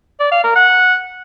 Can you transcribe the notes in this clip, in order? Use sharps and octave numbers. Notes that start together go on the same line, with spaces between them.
D5
F5
A#4
F#5